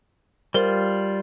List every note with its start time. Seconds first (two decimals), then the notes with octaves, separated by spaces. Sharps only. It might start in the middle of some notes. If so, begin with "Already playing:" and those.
0.54 G3 F4 A#4 C5 G7